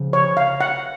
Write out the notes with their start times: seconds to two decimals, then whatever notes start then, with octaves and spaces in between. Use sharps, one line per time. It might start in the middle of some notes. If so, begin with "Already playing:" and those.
Already playing: C#3 F3
0.13 C#5
0.37 F5
0.61 F#5